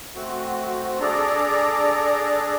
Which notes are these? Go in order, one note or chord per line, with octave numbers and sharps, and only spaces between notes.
A3 C4 F#4
D4 G#4 A4 D5 A#5